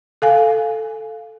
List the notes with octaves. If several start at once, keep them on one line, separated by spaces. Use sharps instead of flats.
A4 F5 G#5